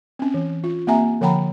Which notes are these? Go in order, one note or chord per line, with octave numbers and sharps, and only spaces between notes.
C4 C#4
E3
F4
A#3 C4 G4 E5 G#5 A#5
D3 F3 F#5 G5 A#5 B5